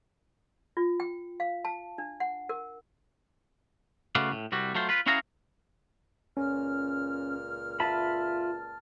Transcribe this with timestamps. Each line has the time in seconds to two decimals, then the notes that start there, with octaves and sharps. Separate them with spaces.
0.77 F4
1.00 G5
1.40 F5
1.65 A5
1.98 D4
2.20 F#5
2.49 A#4
4.15 C#3 A3 F#4 B4 D5 F5
4.32 A2
4.52 C2 C3 G3 F#4
4.75 F#3 A3 F4 C5
4.89 F4 B4
5.06 C#4 E4 F#4 G#4 F5 A#5
6.37 C#2 A#2 C#4 F6
7.80 F4 E5 A5 B5 A6